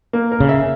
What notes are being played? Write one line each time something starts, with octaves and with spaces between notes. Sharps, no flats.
A#3
A#4
C#3
E5